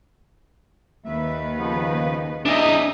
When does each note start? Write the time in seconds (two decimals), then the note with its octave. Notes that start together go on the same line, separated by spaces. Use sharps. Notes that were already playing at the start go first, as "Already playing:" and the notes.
1.05 D#2 D#3 B4 E5
1.57 C#3 F3 B3
2.46 D4 G#4 D#5 E5 D#6